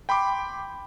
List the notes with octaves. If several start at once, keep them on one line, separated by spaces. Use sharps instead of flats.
G5 B5 C6 D6